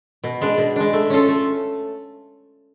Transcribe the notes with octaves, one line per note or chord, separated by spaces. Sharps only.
B2
G#3 D4
B2
G#3 D4
A3
C#4 F4 A4
A3